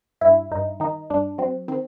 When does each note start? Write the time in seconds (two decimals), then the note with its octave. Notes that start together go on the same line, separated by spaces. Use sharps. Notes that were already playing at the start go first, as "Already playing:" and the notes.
0.21 G2 E4
0.51 G2 D#4
0.80 D#3 D#4
1.10 G2 D4
1.38 F#3 C4
1.68 D#3 C4